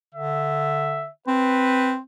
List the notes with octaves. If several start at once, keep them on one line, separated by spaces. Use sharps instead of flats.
D3 E5
C4 B4